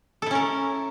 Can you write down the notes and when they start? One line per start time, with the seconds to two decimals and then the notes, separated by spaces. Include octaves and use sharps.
0.22 A4
0.26 E4
0.31 C#4
0.35 A#4